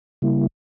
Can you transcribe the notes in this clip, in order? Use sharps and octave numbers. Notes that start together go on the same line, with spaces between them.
C#3 G3 A#3 E4